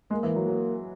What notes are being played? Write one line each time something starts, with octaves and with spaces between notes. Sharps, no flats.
G#3 A#3
E3
F#3
F#3